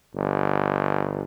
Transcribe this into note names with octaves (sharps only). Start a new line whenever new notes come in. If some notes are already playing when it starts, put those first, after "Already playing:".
G1